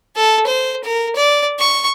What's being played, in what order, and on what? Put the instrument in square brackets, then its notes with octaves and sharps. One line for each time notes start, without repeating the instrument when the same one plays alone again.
[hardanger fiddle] A4
C5
A#4
D5
C#6